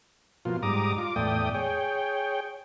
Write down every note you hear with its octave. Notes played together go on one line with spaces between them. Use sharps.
B2 F3 A#3 F4
G#2 G3 A#5 D6 D#6
F4 D6
E2 A2 A3 D5 G5 D#6
G#4 C#5 G5